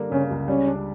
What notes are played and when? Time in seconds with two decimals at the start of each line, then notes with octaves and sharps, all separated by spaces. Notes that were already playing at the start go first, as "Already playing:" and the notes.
Already playing: D3 G3 A#3
0.11 C#3 C#4
0.30 C#2
0.48 G3 C#4
0.67 D4